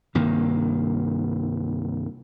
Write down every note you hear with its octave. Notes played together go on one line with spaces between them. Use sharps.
C2 G2 D#3 A#3